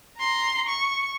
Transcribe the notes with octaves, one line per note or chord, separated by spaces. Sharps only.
A#5 C6
C#6